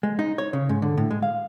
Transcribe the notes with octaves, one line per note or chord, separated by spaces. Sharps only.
G#3
D#4
C#5
C#3
G#2
D3
A2
G#3
F5